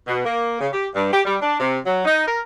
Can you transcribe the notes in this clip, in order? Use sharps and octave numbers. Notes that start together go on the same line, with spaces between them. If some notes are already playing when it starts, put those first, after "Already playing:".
B2
A#3
C#3
G4
G2
G4
G3
D4
C3
F#3
D#4
A#4